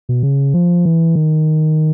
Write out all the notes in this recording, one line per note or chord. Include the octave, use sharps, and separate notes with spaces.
B2
C#3
F3
E3
D#3